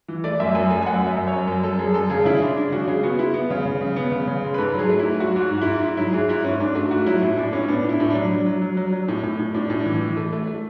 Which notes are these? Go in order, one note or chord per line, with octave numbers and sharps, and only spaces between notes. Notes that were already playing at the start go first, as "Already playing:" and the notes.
E3
A3 D5
F#2 E5
F#2 G#5
A3 G#5
G#5
F#2 F#5
F#2 E5
F#2
F#2 C#5
F#2
F#2 A4
F#2 G#4
F#2 A4
C#3 G#4
C#3 E4
G#3 D4
G#3 D4
C#3 F#4
C#3 G#4
B3 F#4
G#3 E4
B3
C#3
C#3
C#3
B3
C#3
C#3
G#3
B4
G#2 A4
F#3 G#4
A3
E4
G#2
F#3 F#4
G#2 F#4
G#2
E4
G#2
G#2 E4
F#3 E4
G#2 G#4
G#2 E4
G#2 C#4
G#2 D4
A3 F#4
G#2 F#4
F#3 E4
A2 E4
A2 D4
A2 C#4
B3 D4
A2 E4
A2
F#3 D4
F#3
F#3
F#3
F#3
F#3
A2
A2
A2
A2 D4
A2
E3
E3
A3
A3
A3